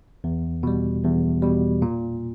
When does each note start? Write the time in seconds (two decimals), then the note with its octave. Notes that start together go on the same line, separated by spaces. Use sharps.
0.24 E2
0.63 B2 G3
1.03 E2
1.42 B2 G3
1.82 A#2